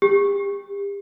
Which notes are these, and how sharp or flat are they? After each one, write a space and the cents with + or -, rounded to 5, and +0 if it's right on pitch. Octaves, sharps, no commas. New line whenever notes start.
G4 +35